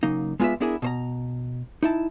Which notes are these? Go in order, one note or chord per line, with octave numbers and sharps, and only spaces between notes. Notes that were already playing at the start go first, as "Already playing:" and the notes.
C#3 F#3 A#3 D#4
G#3 B3 F4 C5 D5 E5
B3 D4 E4 G#4 A#4
B2 C5 A#5
D#4 E4 A5